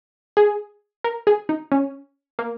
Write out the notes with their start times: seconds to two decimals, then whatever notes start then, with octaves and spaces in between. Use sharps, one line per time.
0.37 G#4
1.04 A#4
1.27 G#4
1.49 D#4
1.72 C#4
2.39 A#3